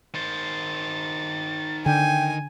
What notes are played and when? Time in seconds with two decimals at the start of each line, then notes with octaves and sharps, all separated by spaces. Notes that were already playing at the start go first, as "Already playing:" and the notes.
0.14 D#3 C5 A6
1.86 D3 G5 G#5